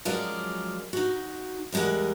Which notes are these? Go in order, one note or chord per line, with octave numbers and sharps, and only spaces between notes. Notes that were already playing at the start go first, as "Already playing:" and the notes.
F3 F#3 G#3 C#4 A#4 D5
D#4 F#4
E2 G3 G#3 A#4 F#5